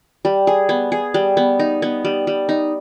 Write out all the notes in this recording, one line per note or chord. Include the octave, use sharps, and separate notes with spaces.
G3
G#4
B3
G#4
G3
B3
D#4
B3
G3
G3
D#4